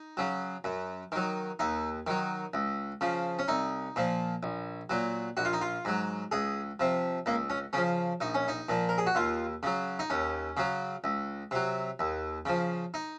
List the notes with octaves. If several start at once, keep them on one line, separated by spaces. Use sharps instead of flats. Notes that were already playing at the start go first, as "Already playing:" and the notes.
Already playing: D#4
C#3 F#3
F#2
D#3 F#3
D#2 D#4
D#3 F#3
C#2
C#3 F3
C#4
C2 D#4
A#2 F3
A#1
A#2 F#3
A#1 F#4
F4
D#4
F4
G#2 F#3
C#2 G#4
C3 F3
C#2 A#3
C#4
C#3 F3 C#4
A#1 D#4
C#4
D#4
A#2 F3
A#4
G#4
F#4
D#2 F4
C#3 F#3
D#4
D#2 C#4
C#3 F#3
C#2
C3 F#3
D#2
C#3 F3
D#4